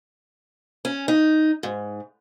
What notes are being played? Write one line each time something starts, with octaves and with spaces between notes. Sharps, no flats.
C#4
D#4
G#2